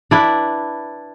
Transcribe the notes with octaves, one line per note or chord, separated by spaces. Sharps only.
D4 E4 B4